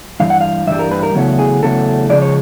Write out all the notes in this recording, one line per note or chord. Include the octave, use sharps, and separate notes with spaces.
G2 E3 F5
F#5
F5
G2 E3 G3 E5
A#4
B4
A#4
E2 C#3 F#3 A3
G#4
E2 C#3 F#3 A3 A4
C#3 F3 G#3 D5
C#5